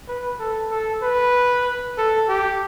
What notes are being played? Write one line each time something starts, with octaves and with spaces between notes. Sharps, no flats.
B4
A4
A4
B4
A4
G4